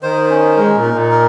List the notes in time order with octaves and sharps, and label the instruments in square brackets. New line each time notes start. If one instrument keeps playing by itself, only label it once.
[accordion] D#3 [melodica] C5
[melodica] C#4
[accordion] G#3 [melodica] A#4
[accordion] A#2
[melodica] D#4
[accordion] A#2
[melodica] A#4